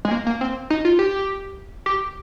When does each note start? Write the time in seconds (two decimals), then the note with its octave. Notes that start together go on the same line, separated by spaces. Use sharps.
0.05 G#3
0.11 A#3
0.27 A#3
0.41 C4
0.70 D#4
0.85 F4
0.99 G4
1.86 G4